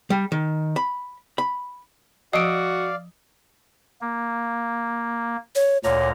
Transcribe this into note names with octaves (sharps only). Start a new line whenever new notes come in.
G3
D#3
B5
B5
F3 F#4 D5 D#5 F5 D#6 E6 D7
A#3
C#5
D2 A#2 C#5 A#5